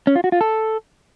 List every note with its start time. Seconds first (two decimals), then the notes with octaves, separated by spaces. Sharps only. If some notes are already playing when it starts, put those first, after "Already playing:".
0.07 C#4
0.16 F4
0.24 F#4
0.32 F4
0.41 A4